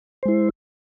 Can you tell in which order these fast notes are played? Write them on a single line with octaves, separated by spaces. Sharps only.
C5 G#3 E4